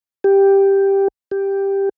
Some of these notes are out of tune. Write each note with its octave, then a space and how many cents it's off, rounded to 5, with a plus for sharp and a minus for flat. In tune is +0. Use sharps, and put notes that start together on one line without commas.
G4 +5
G4 +5